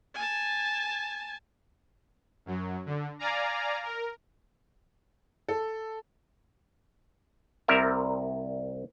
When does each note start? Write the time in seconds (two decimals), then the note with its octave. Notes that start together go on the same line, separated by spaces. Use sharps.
0.15 G#5 A5
2.46 F#2 F#3
2.86 D3
3.19 D5 F5 G#5 A#5
3.83 A#4
5.49 A4
7.68 C2 C3 G3 A#4 E5